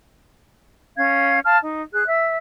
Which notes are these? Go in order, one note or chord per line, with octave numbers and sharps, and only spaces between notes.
C#4 F5 G#6
F5 A5 F6
D#4
G#4 F#6
E5